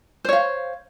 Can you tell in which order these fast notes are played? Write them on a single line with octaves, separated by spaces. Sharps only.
C5 C#5 F5